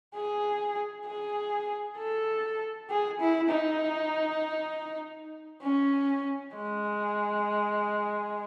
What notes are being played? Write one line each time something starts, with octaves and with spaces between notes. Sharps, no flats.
G#4
G#4
A4
G#4
E4
D#4
C#4
G#3